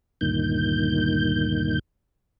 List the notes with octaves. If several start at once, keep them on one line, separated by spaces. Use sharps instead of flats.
D2 G2 A#2 D#3 G6